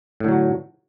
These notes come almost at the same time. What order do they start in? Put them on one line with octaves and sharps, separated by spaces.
A2 D3 F#3